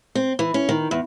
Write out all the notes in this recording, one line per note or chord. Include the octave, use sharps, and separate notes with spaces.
C4
E3
C#4
D#3
E2